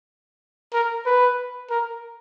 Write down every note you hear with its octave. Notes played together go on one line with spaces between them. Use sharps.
A#4
B4
A#4